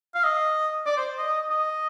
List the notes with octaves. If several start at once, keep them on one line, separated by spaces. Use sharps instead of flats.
F5
D#5
D5
C5
D#5
D#5